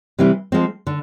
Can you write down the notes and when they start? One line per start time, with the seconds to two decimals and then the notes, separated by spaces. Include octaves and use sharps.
0.18 C3 E3 G3 C4 E4
0.52 F3 G#3 C4
0.87 D3